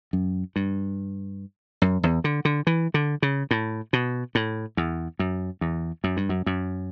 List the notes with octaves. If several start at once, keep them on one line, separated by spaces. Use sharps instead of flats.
F#2
G2
F#2
E2
D3
D3
E3
D3
C#3
A2
B2
A2
E2
F#2
E2
F#2
G2
F#2
F#2